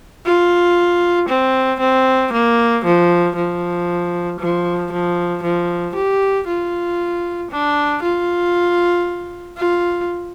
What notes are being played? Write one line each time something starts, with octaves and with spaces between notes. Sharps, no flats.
F4
C4
C4
A#3
F3
F3
F3
F3
F3
G4
F4
D4
F4
F4